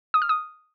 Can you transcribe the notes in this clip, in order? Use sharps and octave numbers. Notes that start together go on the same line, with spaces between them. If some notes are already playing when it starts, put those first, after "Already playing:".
D#6
F6
D#6